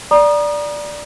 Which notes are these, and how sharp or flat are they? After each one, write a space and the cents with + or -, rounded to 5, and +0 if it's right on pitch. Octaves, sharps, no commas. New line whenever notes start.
D5 +0 A#5 +30 D#6 -30